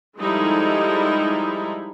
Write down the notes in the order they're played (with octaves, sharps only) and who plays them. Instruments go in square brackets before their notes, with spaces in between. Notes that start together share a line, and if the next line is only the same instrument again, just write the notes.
[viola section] F3 G3 G#3 D#4 E4 A4